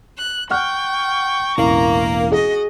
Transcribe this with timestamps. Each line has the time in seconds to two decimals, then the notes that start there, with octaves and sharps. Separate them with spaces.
0.18 F#6
0.51 F#5 G5 C#6 F6 F#6
1.58 E1 A1 E3 A#3 A#5
2.32 F#4 G#4 D#5